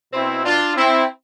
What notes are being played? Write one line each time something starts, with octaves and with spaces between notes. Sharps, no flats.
B2 C4 E4
D4 F4
C4 E4